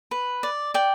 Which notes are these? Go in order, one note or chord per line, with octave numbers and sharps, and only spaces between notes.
B4
D5
D5 G5